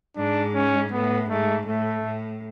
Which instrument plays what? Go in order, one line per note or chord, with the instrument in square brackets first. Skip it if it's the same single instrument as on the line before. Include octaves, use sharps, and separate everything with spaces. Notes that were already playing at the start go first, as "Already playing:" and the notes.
[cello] G#2 [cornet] D4
[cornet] C#4
[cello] A2 [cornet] B3
[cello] G#2 [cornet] A3
[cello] A2 [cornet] A3
[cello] A2